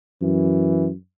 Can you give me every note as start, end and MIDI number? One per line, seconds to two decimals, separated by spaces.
0.22 0.94 42
0.22 0.89 52